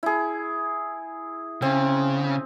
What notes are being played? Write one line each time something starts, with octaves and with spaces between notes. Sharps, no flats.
E4 G#4
C#3 C4